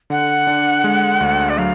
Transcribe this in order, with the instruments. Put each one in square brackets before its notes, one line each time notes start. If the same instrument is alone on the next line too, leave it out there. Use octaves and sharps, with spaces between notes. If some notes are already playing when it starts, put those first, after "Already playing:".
[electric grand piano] D3 [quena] F#5
[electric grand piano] D4
G#3
D2
[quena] D5
[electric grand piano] F#3 [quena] F5